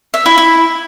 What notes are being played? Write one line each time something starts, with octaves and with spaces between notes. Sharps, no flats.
E5
E4
E4